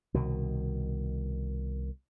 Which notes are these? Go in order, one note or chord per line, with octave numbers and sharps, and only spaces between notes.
C2 B2 D#3